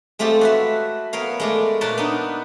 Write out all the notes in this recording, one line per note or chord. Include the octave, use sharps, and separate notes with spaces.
G#3 A3 C4 F4 G4
F#4 B4 E5
B3 A#4 C#5 F5
G#3 A3 D5
A#2 A#4 B4 C#5 A5
B3 D4 D#4